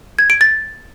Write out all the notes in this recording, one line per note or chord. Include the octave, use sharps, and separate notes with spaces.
G#6
D7
A6